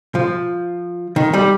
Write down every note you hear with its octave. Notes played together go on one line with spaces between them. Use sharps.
F3
D#3
G3